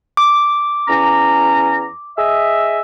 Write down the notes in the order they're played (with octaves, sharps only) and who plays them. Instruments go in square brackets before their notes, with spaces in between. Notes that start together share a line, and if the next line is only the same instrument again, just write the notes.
[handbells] D6
[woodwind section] E2 C#4 A#5
G#4 D#5 E5